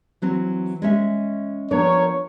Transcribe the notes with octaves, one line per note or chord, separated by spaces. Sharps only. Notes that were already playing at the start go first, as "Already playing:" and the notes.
E3 F#3 C4
G#3 C#4 E5
F3 B3 D4 A#4 C#5